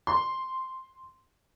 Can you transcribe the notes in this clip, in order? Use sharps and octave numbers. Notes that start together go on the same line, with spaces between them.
C6